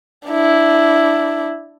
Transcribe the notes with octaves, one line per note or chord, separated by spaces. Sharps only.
D4 E4